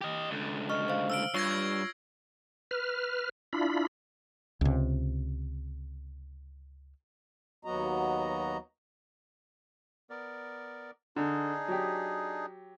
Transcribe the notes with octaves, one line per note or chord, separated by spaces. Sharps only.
G4 D#5
C#2 D3
D#5 C#6 F6
C5 F5
E6 F6 D7
G2 F4 C#5 C#6 G#6 A#6 C7
B4 F6
D4 E4 F4 B5
C#2 C3
D#2 F#3 B3 F#4 D#5 A#5
B3 A#4 D5
D3 D4 D#4 G#4
F#3 G4